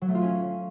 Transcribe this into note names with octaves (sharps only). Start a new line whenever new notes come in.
F#3
A3
F4
C#4